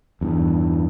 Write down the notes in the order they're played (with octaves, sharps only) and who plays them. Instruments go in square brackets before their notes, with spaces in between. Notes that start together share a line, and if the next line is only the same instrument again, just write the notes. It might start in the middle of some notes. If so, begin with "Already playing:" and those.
[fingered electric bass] E2 G2